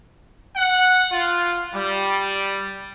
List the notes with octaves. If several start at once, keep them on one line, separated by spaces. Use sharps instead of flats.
F#5
F4
G3